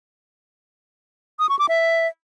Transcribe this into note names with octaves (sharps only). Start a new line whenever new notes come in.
D#6
C#6
D6
E5